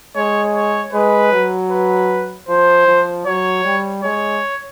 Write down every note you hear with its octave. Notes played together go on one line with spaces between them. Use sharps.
G#3 C#5
C#5
G#3 B4
F#3
B4
F3 C5
F3
F#3 C#5
G3
G#3 C#5